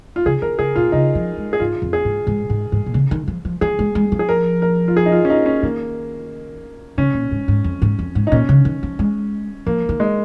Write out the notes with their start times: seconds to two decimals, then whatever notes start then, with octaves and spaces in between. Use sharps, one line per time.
0.16 F4
0.26 C#3 G#4
0.42 D#3 A#4
0.59 C#3 G#4
0.76 A#2 F4
0.92 C#3 D#4
1.15 F3
1.38 G#3
1.53 G#4
1.60 G#2 F4
1.82 F2
1.93 G#4
2.05 G#2
2.27 G#2
2.50 G#2
2.72 G#2
2.86 A#2
2.94 C#3
3.11 D#3
3.28 F3
3.45 F3
3.61 F3 G#4
3.79 G#3
3.95 G#3
4.12 F3
4.19 G#4
4.29 A#4
4.62 A#4
4.88 F4
4.97 G#4
5.06 D#4
5.12 F4
5.25 C#4
5.30 D#4
5.46 C#4
5.63 D#3 A#3
6.98 C#3 C#4
7.14 A#2
7.31 G#2
7.48 G#2
7.64 F2
7.82 G#2
7.99 F2
8.15 G#2
8.27 D#4
8.32 A#2 C#4
8.49 C#3
8.65 D#3
8.83 F3
8.99 G#3
9.66 F3 A#3
9.89 D#3
10.00 G#3